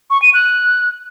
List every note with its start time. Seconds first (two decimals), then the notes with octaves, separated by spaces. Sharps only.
0.10 C#6
0.22 D#7
0.34 F#6